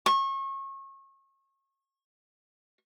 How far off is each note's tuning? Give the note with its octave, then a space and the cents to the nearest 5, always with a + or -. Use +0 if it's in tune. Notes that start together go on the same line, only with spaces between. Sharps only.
C#6 -30